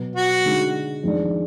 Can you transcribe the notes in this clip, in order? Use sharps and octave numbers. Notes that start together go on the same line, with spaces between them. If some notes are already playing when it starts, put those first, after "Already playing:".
Already playing: B2 F#3 B3
F#4
D3 G#3 D#4
F2 D#3 G#3 D4